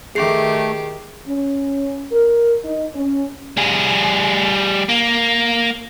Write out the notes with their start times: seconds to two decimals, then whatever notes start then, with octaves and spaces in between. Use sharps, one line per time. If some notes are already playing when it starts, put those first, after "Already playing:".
0.15 D#3 A3 G4 G#4 C7
1.28 C#4
2.12 A#4
2.64 D#4
2.95 C#4
3.57 G3 G#4
4.89 A#3